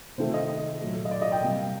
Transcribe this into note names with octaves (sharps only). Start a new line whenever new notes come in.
C3 D#3 A3 C5
D#5
A#2 F#3 A3
D#5
D5
D#5
G5
C3 G3 A#3